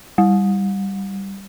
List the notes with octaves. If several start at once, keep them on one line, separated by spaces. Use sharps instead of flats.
G3